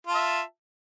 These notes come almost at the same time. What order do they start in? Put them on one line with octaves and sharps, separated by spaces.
F4 A5 E5